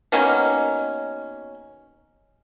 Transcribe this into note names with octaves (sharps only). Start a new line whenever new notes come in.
B2 D#3 A#3 C#4